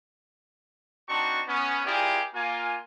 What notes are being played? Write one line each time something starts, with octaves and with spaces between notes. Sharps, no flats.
C4 D4 D#4 F#4 A5 C#6
B3 C#4
E4 F4 G4 G#4 A#4 D5
A#3 F4 G#5